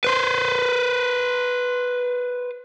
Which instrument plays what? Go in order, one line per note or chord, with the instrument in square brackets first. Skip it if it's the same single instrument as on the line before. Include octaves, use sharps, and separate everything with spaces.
[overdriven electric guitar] B4 C5